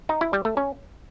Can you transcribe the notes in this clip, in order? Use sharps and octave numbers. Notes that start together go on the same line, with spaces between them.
D#4
E4
G3
A3
C#4